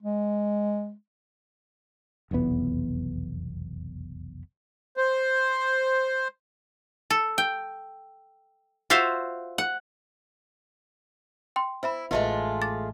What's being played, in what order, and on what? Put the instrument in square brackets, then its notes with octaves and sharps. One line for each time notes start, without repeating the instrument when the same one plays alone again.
[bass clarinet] G#3
[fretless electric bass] F1 B1 E2 B3
[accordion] C5
[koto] A4
G5
F4 F#4 C5 E5 F5
F#5
[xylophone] G5 C6
[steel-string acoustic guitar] E4 [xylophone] C5 E5 B5
[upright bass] A1 [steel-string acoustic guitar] G#3 A3 F4 [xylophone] B4 D#5 E5
[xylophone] D6 A6